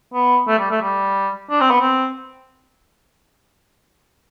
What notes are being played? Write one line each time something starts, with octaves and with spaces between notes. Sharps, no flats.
B3
A3
G3
A3
G3
D4
C4
B3
C4